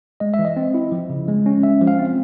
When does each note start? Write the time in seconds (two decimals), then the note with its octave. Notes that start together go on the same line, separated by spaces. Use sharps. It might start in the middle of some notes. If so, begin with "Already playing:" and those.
0.20 G#3 D#5
0.34 E5
0.39 E3
0.45 D#5
0.57 C4
0.74 E4
0.92 F3
1.10 C#3
1.28 G#3
1.46 C#4
1.63 G#3 E5
1.81 F3
1.87 F5
1.99 C4